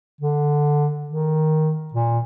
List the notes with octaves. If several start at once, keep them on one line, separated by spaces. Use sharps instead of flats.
D3
D#3
A#2